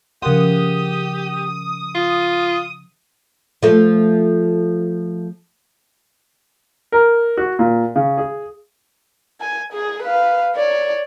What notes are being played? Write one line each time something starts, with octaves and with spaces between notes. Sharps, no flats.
C#3 F3 G4 A#4 F#5 C6 D#6
F4
F3 A3
A#4
F#4
A#2
C#3
G#4
G#5
G#4
B4 F5
C#5 D5